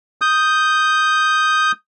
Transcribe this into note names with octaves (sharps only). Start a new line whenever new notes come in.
D#6 G6